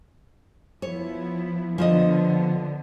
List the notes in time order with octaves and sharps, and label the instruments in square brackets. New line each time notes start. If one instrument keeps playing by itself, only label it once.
[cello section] F3 B3 E4 [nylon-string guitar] C#5
[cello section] D3 B3 [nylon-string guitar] F3 F4 D#5